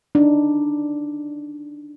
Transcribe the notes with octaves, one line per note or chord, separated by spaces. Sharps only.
D4 D#4